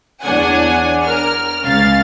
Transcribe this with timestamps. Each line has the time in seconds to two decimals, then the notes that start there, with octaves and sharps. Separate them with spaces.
0.22 E2 D4 C#5 F#5 G#5
1.03 A#4 F6
1.64 C#2 C#4 F5 F6 A6